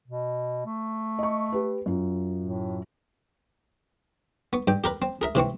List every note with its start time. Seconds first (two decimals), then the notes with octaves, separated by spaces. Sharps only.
0.08 B2
0.66 A3
1.19 D#5 C#6
1.52 G4 B4
1.86 F#2 F4
2.40 A2
4.53 B3 C#6
4.67 G2 G5
4.84 G4 A#4 B4
5.02 C4
5.21 G#4 A#4 E5
5.35 C3 E3 C4 C#6